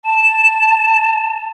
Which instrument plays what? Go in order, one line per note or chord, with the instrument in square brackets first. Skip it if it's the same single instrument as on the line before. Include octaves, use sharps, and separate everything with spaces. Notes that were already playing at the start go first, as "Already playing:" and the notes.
[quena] A5 [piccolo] E7